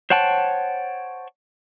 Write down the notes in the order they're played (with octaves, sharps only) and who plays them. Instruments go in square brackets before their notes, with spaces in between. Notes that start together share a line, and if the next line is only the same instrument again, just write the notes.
[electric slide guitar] C5 C#5 F#5 G5 A5